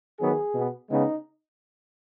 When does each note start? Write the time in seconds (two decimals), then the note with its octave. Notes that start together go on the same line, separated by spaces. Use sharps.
0.20 D#3 F#3 B3 G#4
0.55 B2 B3
0.89 C#3 G#3 B3 D#4